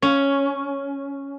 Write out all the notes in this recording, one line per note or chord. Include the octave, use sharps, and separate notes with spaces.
C#4